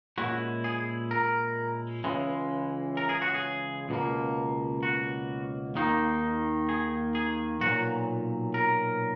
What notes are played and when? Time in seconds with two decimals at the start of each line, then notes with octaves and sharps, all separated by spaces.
0.18 A#2 G#3 C#4 E4 F#4
0.64 G#4
1.11 A#4
2.04 C#2 C#3 E3 G#3
2.97 A#4
3.09 G#4
3.22 F#4
3.34 G#4
3.89 C#2 B2 A#3
4.83 F#4
5.75 D#2 D#3 A#3 D#4
6.69 G#4
7.15 G#4
7.61 B1 A#2 F#3 F#4
8.54 A#4